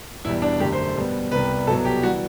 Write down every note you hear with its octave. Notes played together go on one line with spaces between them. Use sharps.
E2 B2 G3 E4
D4
F#2 D3 A3 G4
C5
B2 G3 B3
C2 C3 G3 B3 B4
C2 B2 F#3 B3 A4
G4
E3 G3 F#4